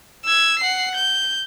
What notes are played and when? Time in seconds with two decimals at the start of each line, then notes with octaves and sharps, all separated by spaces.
0.25 E6 G#6
0.59 F#5 C7
0.95 G6